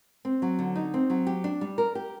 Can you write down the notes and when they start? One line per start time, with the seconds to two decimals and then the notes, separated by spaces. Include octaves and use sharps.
0.25 C4
0.42 F#3
0.59 D3
0.76 D#4
0.94 C4
1.10 F#3
1.27 G4
1.44 D4
1.61 G3
1.78 A#4
1.95 G4